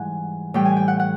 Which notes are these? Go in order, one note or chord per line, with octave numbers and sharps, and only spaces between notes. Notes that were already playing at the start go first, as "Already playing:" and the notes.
Already playing: G#2 E3 G3 F#5 G#5
A2 E3 G3 G5
G#5
G5
F#5
F#5